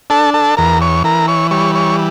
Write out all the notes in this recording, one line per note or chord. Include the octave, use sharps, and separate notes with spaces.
D4 A4 A5
A4 A5
E2 A#4 A#5
C#5 C#6
E3 A#4 A#5
C#5 C#6
G3 C#5 C#6
C#5 C#6